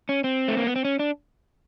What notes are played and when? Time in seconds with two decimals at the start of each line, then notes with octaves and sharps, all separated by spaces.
0.09 C#4
0.24 C4
0.48 A3
0.57 A#3
0.67 B3
0.76 C4
0.85 C#4
0.99 D4